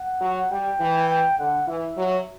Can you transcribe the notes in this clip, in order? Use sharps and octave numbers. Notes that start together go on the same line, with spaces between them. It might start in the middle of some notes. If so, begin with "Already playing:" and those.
Already playing: F#5
F#3
G3 G5
E3
G5
D3 F#5
E3 E5
F#3